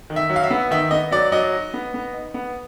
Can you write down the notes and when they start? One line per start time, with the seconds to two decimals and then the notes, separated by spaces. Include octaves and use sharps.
0.10 D#3
0.16 E5
0.30 F#3
0.36 F5
0.43 E5
0.51 B3
0.71 D#3 E5
0.91 B3 D#5
1.12 F#3 D5
1.32 F#3 D#5
1.53 D#4
1.74 B3
1.94 B3
2.14 D#4
2.34 B3